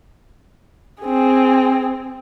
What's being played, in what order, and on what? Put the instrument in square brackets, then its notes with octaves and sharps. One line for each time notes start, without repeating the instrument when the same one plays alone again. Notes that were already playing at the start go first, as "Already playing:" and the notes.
[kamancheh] C4 G#4